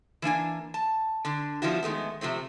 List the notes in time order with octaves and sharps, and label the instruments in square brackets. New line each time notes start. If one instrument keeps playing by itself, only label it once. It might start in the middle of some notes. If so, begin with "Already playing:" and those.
[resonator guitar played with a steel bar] E3 A#3 D4 G#5
A5
D3 D4
F3 G3 B3 E4 F#4
D#3 G#3 A3 B3
C3 F3 A3 C4